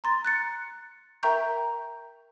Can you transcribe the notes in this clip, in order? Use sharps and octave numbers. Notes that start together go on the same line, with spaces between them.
A#5 C6 A6
F#6 A6 C#7
A#4 E5 G5 A#5 C#6 G6